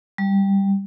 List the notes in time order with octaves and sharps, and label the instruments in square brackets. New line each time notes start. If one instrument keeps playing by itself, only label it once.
[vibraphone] G3